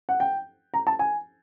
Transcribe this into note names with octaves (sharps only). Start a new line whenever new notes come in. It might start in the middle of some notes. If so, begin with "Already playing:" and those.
F#5
G5
A#5
A5
G#5